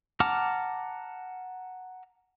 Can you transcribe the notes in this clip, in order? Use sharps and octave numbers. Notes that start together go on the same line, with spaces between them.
F#5 A5 A#5 D6 F6